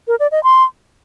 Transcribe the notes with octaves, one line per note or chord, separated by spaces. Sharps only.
A#4
D5
D#5
C6